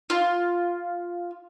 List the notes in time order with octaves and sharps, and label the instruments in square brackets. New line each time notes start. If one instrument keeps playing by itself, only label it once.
[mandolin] F4